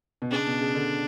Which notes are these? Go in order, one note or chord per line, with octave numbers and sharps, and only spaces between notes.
B2
C#3 D4
B2
C#3
D3